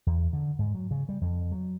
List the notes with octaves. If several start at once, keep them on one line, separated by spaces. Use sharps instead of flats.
E2
D3
G#2
F#3
C#3
G3
F2
F#3